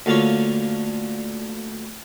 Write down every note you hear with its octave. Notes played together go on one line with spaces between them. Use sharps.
D2 D3 A#3 F4 C#5